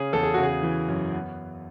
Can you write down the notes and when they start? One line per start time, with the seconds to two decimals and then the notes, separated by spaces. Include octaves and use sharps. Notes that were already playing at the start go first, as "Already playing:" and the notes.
Already playing: C#3 C#4 G#4
0.13 E2 A4
0.23 G#4
0.34 C#3 F#4
0.43 G#4
0.63 E3
0.88 F#2
1.13 B3